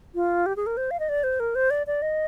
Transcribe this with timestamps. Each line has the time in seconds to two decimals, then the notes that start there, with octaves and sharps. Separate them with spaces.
0.15 F4
0.46 G4
0.56 G#4
0.66 A#4
0.77 C5
0.91 F5
1.00 D#5
1.09 D5
1.24 C5
1.40 A#4
1.55 C5
1.70 D5
1.87 D5
2.02 D#5